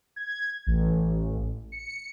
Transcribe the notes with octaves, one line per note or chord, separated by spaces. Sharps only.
G#6
A1
C#7